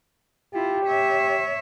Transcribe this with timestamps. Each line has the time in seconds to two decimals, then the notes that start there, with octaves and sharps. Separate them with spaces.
0.54 E4 F4 G4
0.86 C#5 E5